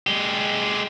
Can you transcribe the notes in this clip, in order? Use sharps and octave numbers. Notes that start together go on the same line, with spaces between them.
G#3 G4